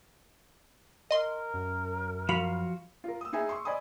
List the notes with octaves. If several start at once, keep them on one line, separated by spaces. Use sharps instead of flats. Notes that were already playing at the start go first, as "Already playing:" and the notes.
A#4 D#5 C6
F#2
F3 F#4 F5 B5
F4 A#4
D#6 E6
D#4 E4 G#4 E5 G#5
C6 C#6
D5 D#5 G#5 B5 D#6